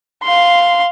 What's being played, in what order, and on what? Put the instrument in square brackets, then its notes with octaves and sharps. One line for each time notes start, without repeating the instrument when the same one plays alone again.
[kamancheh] F5 C6